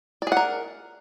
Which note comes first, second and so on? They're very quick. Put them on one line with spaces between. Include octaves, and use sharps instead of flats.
D5 G#4 F#5 A#4